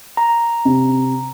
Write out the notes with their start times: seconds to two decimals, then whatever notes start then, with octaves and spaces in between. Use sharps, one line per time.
0.17 A#5
0.65 C3